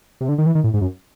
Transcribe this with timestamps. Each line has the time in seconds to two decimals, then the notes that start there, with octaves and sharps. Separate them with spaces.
0.21 C3
0.29 D3
0.38 D#3
0.46 E3
0.55 D#3
0.64 A2
0.74 G#2
0.81 F#2